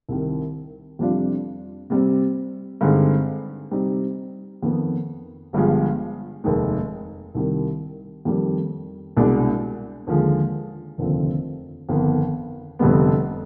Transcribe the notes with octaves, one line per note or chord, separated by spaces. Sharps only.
C2 C3 D#3
F2 C3 G3 D4 F4
C3 G3 C4
G2 D3 G#3 C4 D#4
C3 G3 C4 D#4
F2 D#3 B3
G1 G2 F3 G#3
F1 D#2 D#3 G#3
C2 C3 D#3 G3
F2 D#3 G3
C2 B2 G#3 D4
D#2 D3 F3 G#3
F1 D#2 D3 F3 C4
G1 F2 D#3 B3
F1 F2 D3 G3 B3